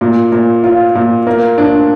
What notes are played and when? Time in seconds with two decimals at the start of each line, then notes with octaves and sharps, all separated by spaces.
0.01 A#2
0.32 A#2
0.64 F4
0.95 A#2
1.27 A#3
1.58 D4